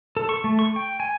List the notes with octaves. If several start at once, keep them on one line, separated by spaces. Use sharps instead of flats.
A4
C#6
A3
C#6
G5
G#5